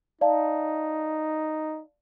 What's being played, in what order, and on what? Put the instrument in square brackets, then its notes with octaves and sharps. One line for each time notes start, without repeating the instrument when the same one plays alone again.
[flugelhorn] D#4 [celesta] D5 F5 A5